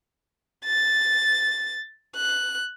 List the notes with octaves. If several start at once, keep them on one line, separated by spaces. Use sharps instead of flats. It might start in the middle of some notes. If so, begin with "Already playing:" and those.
A6
F#6